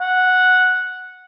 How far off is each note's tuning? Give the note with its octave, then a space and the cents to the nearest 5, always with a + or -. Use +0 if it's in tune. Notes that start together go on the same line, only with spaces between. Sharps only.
F#5 -5